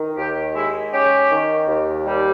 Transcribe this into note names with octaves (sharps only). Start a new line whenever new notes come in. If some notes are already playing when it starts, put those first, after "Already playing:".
Already playing: D#3
D#2 G4
G#3 E4
C#4 G4
D#3
D#2
G3